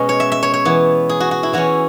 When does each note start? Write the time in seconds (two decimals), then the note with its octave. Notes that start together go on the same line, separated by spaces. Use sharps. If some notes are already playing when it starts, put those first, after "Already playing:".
Already playing: B2 G#3 C#4
0.09 C#5
0.20 E5
0.32 E5
0.43 C#5
0.54 C#5
0.65 E3 B3
1.09 G#4
1.20 F#4
1.31 F#4
1.43 E4
1.53 E3 C#4 F#4